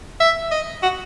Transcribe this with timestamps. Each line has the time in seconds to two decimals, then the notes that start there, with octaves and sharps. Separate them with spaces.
0.20 E5
0.51 D#5
0.83 F#4